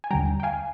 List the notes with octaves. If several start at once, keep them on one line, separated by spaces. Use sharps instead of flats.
G#5
D#2 D3 G3 G5 A#5
G5
F5 G#5